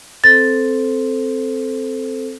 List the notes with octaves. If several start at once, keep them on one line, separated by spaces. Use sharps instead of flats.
C4 A4 C5 A6